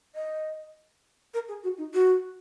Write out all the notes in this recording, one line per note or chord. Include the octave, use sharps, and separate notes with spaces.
D#5
A#4
G#4
F#4
D#4
F#4